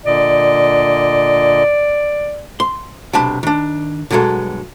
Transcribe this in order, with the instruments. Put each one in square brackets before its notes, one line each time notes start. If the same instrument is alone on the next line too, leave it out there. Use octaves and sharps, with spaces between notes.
[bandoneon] A#2 D3 D#5 [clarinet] D5
[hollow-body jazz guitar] C6
B1 C3 D4 A5 B5
D#3 D4
G2 B2 F#3 G#3 A4